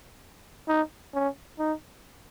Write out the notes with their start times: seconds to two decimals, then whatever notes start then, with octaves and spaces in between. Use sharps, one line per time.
0.68 D#4
1.14 C#4
1.59 D#4